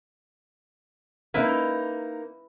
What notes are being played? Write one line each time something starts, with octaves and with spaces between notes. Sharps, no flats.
A#3 D#4 E4 B4